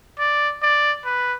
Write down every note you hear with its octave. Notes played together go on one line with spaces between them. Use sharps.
D5
D5
B4